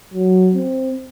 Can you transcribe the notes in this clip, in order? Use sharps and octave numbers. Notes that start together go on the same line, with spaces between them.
F#3
C4